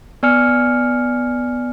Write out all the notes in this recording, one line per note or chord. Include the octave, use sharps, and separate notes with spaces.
B3 D5 G#5 F6 C#7